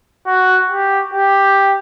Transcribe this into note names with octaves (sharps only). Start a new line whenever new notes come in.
F#4
G4
G4